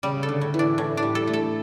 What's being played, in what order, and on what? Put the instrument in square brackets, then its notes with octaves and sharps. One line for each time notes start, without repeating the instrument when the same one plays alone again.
[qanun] C#3 [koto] G3
[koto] A4
[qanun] D3
[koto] A2
[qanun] E3
[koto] D4
A2
D4
[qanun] G3
[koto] A4
[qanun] A3
[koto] A4